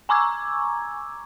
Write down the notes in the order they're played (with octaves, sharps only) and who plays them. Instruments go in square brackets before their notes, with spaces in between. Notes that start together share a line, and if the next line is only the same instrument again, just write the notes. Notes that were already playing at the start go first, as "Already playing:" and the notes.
[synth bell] G#5 A#5 C#6 D6 E6 G#6